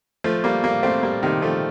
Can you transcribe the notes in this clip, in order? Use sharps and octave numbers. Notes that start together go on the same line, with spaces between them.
F3 A3
G3 A#3
G3 A#3
A3 C4
G3 A#3
C3 D#3
F3 A3